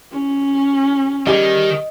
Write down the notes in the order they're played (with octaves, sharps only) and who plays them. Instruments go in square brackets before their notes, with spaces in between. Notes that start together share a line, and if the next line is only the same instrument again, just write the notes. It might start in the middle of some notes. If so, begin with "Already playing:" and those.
[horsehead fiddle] C#4
[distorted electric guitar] D#3 [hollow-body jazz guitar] G3 G#4 [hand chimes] D#5